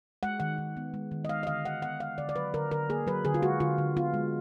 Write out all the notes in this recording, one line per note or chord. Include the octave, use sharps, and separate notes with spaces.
G#3 F#5
D#3 F#5
D#3
B3
G#3
D#3
D#5
G#3 F5
D#5
D3 F5
D3 F#5
B3 F#5
G#3 F5
D3 D5
D5
F#3 B4
D3 A#4
D3 A#4
A#3 G#4
F#3 B4
D3 G#4
F4
G#3 F#4
D3 F4
D3
B3 F4
G#3